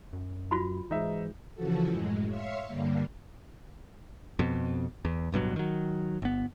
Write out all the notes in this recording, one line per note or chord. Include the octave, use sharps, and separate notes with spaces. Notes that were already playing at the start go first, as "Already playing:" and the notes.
F#2
F#3 F4 F#4 B5
G#2 E3 D#4 E5
C#3 E3 F3 F#4 A4
F#2 A2 G#3
C#5 E5 F5 C6 C#6
G2 D3 G3 A#3
F2 B2
E2
D1 G2 B2 F#3
D#3 F#3
G1 B3